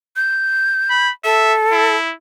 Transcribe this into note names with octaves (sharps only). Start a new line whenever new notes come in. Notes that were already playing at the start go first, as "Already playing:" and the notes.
G6
B5
A4 E5
E4